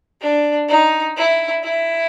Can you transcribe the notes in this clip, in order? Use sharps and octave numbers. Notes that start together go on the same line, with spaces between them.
D4
D#4
E4
E4